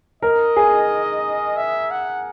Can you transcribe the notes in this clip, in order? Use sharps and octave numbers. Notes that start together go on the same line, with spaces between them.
A#4 D#5
G#4
E5
F#5